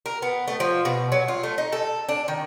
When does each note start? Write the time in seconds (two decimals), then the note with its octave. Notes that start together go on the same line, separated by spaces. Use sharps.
0.06 A#4
0.22 B3
0.48 A3
0.60 F3
0.85 B2
1.12 F#3
1.28 F4
1.43 A3
1.58 D#4
1.72 A4
2.09 D4
2.28 D#3